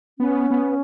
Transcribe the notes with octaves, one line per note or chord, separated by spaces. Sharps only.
B3 C#4
B3